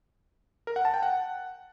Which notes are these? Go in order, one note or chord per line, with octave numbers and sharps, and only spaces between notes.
A#4
F#5
A5
G5
F#5